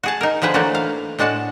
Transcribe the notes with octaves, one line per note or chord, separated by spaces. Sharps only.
F#4 G#4 A5
D#4 A#4
D3 F3 G#4 B4 C5
E3 F#3 A3 A#3 D4 F#4
F5
A2 G#3 D4 F#4 A5